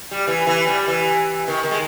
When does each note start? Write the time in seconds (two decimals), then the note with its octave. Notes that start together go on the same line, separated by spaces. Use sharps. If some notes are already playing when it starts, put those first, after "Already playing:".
0.11 G3
0.27 E3
0.47 E3
0.67 G3
0.88 E3
1.48 D#3
1.63 D#3
1.71 G#3